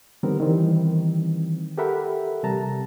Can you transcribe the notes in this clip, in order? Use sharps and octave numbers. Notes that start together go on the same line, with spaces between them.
D3 D#3 G3 B3 C4 A#4
D#3 E3 G3 C4
G4 A4 A#4 E5 F#5 B5
C3 G3 A5 A#5